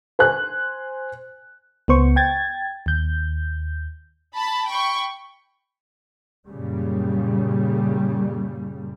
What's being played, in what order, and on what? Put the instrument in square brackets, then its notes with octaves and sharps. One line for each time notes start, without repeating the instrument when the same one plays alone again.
[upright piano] C5 G#5 F#6
[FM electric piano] C#2 B3 C5 C#6
G5 G#6 A6
D#2 G6
[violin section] A5 B5
G5 B5 C#6
[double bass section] F#2 A#2 C#3 G3